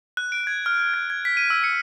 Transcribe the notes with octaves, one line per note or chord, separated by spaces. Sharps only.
F#6
D7
G#6
F6
G#6
G#6
B6
D#7
E6
C#7